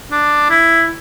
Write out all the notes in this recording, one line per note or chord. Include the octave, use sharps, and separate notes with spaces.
D4
E4